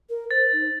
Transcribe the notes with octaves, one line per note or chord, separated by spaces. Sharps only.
A#4
C5 A6
D#4